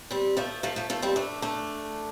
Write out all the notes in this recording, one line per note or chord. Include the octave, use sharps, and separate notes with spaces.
G3 C4
F3 A3
F3 A3
F3 A3
F3 A3
G3 C4
A3 D4
A3 D4